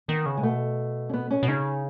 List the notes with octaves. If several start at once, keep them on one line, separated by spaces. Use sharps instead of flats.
D#3 B3
C#3
G#3
B2 A3
C#4
B3
C#4
B2
C#3 D#4